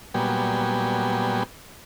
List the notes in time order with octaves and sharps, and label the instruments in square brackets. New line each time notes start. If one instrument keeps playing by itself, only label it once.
[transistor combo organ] A#2 F#3 G3 B3 G5 G#5